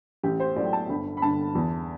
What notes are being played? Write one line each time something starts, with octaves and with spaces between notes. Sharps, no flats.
A1 G4
C5
A2 F#3 D5
G5
A5
G1 B5
B5
G2 D3 A5
E2